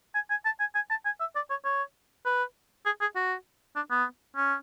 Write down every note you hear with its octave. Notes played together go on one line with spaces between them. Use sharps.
G#5
G#5
A5
G#5
G#5
A5
G#5
E5
D5
C#5
C#5
B4
G#4
G#4
F#4
D4
B3
C#4